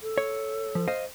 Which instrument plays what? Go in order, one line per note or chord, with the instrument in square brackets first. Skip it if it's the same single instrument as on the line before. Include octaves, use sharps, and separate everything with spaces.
[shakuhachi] A4
[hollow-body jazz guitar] C#5
F3
C5 D#5 F5